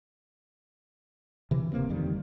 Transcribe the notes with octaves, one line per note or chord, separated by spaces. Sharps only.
C3 E3
D#1 C3 A#3 C4
G1 F2 D#3 G3